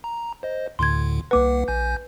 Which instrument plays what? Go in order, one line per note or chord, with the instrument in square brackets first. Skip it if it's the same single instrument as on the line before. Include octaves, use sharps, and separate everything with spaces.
[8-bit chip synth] A#5
C5 D#5
[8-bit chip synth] D2 A2 D3 [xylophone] C6 G#6
[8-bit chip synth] C2 A#3 F#5 [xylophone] B4 D6
[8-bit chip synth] A#1 G#5 G6